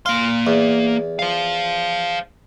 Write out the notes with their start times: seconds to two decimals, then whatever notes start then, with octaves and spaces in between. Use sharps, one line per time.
0.06 A#3 F5 C6
0.47 E2
1.19 C5 F5